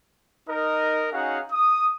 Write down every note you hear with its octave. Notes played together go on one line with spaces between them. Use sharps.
D#4 A#4 D#5
C#4 D#4 F#4 G#4 F5 F#5
D#6